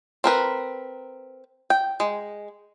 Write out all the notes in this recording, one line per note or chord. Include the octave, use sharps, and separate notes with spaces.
C4 A#4 B4
G5
G#3